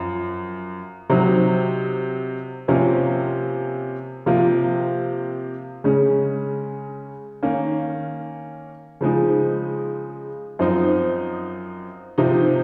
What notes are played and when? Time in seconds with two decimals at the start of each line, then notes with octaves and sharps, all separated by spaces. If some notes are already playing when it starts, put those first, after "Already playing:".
Already playing: F#2 F3
1.10 C3 F#3 C4 D#4
2.68 C3 F3 A#3 C#4
4.26 C3 F3 A#3
5.84 C#3 G#3 C#4
7.43 D#3 A#3 C#4
9.01 C#3 F3 G#3 D#4
10.59 F#2 F3 C4 D#4
12.18 C3 F3 C4 D#4